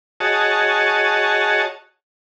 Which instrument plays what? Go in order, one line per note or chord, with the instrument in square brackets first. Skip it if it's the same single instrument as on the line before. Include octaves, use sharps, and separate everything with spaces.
[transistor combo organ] F#4 G#4 C#5 D#5 A5